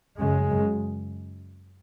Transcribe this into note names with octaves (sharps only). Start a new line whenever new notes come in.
F#2 C#3 G#3
F#2 C#3